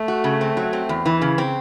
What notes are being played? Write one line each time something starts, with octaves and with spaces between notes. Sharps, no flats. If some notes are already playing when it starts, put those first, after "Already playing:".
Already playing: A3
F#4
C#3
C4
F#3
C4
E2
E3
C#3
C4